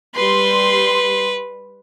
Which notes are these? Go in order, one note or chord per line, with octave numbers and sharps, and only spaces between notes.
G3 B4 C6